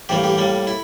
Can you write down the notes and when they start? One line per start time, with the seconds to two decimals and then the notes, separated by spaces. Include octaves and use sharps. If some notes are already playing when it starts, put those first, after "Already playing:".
0.09 A1 G2 E3 A#3 G4
0.24 G4
0.38 A2 G3 A#3
0.67 E4